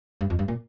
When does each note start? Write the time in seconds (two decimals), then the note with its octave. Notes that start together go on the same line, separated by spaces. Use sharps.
0.21 G2
0.30 F2
0.39 G2
0.48 A#2